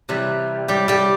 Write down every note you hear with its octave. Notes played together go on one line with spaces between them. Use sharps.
C3 E3 G3
G3 G4
G3 G4